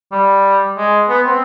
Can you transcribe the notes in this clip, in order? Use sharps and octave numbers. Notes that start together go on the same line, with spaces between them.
G3
G#3
B3
C4